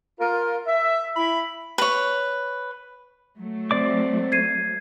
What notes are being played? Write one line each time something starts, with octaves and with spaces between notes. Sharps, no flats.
F4 A#4
E5
E4 B5
B4 C#5
F#3 A3
C4 D5 D6
G#6 C7 D#7